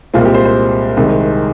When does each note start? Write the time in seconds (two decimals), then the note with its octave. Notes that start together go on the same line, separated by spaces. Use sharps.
0.14 C2 A#2 G#3 C4 F4
0.25 G4
0.34 C5
0.45 C5
0.97 C2 C3 D#3 G#3